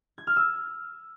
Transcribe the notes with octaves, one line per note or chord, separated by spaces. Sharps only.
G#6
F6
E6